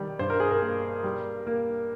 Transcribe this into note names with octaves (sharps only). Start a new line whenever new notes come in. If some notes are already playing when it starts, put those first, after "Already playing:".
Already playing: D#3 G3
G2 C5
A#4
G#4
A#4
A#3
G3
A#3